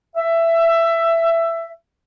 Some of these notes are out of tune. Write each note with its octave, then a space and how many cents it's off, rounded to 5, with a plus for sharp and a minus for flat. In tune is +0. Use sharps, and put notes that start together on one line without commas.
E5 +15